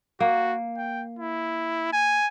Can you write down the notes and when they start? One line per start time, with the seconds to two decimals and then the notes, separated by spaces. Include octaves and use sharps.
0.20 A#3 F#4
0.77 G5
1.19 E4
1.93 G#5